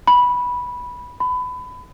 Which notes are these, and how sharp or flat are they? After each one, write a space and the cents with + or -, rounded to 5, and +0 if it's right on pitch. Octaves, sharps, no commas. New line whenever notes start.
B5 -10
B5 +25